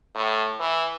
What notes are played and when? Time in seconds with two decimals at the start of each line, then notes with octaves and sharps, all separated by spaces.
0.15 A2
0.60 E3